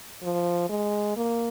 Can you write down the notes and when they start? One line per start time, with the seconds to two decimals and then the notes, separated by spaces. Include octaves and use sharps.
0.23 F3
0.69 G#3
1.17 A#3